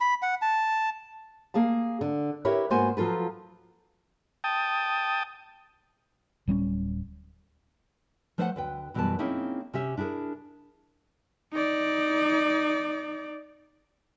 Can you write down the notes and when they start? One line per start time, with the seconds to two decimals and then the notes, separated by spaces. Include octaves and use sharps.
0.01 B5
0.22 F#5
0.42 A5
1.54 A#3 G#4 F5 A5
2.01 D3
2.45 E4 G4 A#4 B4 C#5
2.70 G#2 A#3 B3 F#4 C5 G#5
2.97 F3 F#3 F4 A4 B4
4.44 G5 A5 D#6
6.48 D1 G3 A#3 C#4
8.38 F3 A3 B4 C5 F5 F#5
8.56 D2 B4 G5
8.94 F#2 B2 E3 G3 B4 A5
9.19 A#3 C4 C#4 D#4 E4 G#4
9.74 C3 C#4 G4 E5
9.97 D4 E4 F#4 G#4 A#4
11.53 D#4 D5